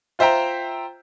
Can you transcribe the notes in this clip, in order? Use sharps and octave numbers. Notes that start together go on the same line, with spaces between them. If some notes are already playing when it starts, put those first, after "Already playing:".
F4 C5 E5 G5 A#5